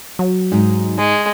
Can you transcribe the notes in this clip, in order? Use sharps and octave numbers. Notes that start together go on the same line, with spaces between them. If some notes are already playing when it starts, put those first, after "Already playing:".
F#3
G#2 D#4
G#3